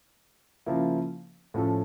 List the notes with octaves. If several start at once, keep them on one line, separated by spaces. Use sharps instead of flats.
C#3 F3 A#3 E4
A2 F3 C#4 F4 A4